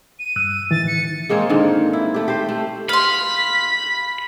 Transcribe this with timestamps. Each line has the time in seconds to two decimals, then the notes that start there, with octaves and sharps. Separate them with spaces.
0.19 D#7
0.36 G2 E6 F#6
0.71 A2 D#3 E3 A6
0.87 C#7
1.29 G#3 A#3 C4 C#5
1.49 G#2 D3 D#3 A#3
1.93 E4
2.14 A3 G4
2.28 G4 C5
2.49 A3
2.89 F5 B5 C6 B6